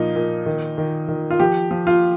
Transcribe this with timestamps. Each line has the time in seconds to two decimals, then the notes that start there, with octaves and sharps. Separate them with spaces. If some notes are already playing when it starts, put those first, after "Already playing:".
Already playing: A#2 F3 D#4
0.16 A#2
0.46 D#3
0.78 D#3
1.08 D#3
1.31 F4
1.40 F3 G4
1.71 F3
1.87 F4